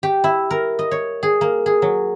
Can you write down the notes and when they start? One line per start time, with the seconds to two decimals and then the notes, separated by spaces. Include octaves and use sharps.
0.03 G4
0.24 E4
0.51 A#4
0.79 D#5
0.91 C#5
1.23 G#4
1.41 A#3
1.66 G#4
1.82 F#3